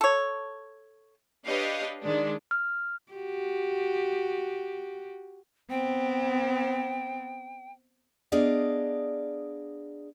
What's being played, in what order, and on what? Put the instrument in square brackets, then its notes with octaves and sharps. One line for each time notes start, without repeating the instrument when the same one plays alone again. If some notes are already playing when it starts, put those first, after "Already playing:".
[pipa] A4 C#5
[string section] D4 G4 B4 C#5 D#5 F5
D#3 G#3 D4
[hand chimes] F6
[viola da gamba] F#4 G4
[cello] B3 C4 [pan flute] G5
[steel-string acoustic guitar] B3 D4 G#4 D5 D#5 F5